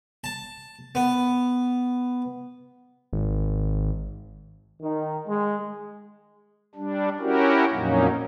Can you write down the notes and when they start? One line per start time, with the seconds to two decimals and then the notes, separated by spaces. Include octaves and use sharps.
0.24 A5
0.95 B3
3.13 G#1
4.83 D#3
5.27 G#3
6.75 G3 D4
7.19 C#4 E4 F#4 G4 A#4
7.72 F2 A#2 F#3 A#3 C#4 D#4